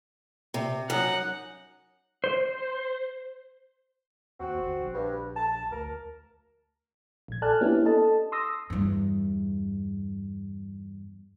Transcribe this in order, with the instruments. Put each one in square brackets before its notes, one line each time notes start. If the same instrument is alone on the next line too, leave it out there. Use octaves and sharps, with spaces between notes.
[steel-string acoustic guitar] C3
[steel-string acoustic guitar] F#2 [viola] D#4 F#5
[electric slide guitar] C5
[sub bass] D#2 [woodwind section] C4 F#4
[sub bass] G1
A#1
[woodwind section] G2
A5
[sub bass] D2 [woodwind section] A#4
[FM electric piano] A#1 G#6
A4 D5 G#5 A5 F6 F#6
A#3 B3 C#4 D4 E4 G4
A4 D#5 A5
C6 D#6 E6 A#6
[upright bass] E2 G2